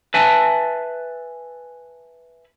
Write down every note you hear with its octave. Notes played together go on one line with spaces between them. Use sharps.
B4 E5 G#5 A5